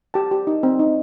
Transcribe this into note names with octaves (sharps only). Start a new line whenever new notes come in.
G4 A5
G4
D#4
C4
D#4